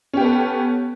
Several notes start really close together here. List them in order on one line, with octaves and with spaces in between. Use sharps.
C#4 G4 B3 A4